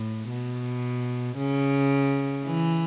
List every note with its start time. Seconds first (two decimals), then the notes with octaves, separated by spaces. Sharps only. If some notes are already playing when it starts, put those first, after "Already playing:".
Already playing: A2
0.30 B2
1.38 C#3
2.45 E3